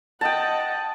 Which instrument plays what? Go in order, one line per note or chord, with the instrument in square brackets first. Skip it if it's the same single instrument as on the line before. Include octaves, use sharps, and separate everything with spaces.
[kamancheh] D#5 F#5 [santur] G5 A5